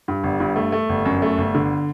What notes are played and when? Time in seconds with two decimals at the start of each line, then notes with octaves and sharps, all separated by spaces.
0.08 G2
0.24 G1
0.40 G2
0.56 A3
0.72 A3
0.89 G1
1.05 F#2
1.22 A3
1.38 G1
1.55 D3